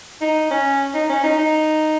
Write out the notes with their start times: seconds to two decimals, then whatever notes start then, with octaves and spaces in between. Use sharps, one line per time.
0.21 D#4
0.51 C#4
0.95 D#4
1.09 C#4
1.24 D#4
1.38 D#4